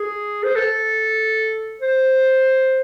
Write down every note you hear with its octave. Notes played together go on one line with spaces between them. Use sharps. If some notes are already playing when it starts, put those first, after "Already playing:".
Already playing: G#4
C5
A4
C5